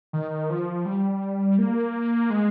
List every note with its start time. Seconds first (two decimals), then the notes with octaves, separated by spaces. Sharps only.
0.13 D#3
0.50 F3
0.86 G3
1.59 A#3
2.30 G#3